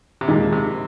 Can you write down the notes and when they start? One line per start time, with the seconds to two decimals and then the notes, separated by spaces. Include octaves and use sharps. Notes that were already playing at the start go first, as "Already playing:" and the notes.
0.21 C3
0.28 D#2 A#2 D#3 G#3 D#4 G#4
0.52 C3